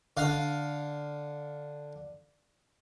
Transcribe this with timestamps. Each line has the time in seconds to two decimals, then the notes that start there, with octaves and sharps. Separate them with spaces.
0.17 D3 F5